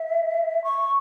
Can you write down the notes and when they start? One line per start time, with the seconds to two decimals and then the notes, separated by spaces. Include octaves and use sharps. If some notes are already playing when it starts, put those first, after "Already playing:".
Already playing: E5
0.64 C#6